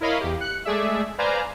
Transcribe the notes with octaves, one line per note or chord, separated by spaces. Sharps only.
E4 A#4 C#5 D#5 F5 B5
E2 G4
F#6 C#7
G#3 A3 G#4 D5 E5
B4 C5 D5 F5 G#5 A#5